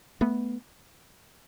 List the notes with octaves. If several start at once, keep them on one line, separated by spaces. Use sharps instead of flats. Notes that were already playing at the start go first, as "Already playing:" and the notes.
A3 B3